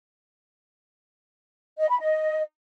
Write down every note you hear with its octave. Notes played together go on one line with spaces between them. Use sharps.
D#5
B5
D#5